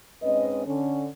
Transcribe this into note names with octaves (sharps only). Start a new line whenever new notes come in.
G#2 C4 C#4 B4 D#5
D3 C#4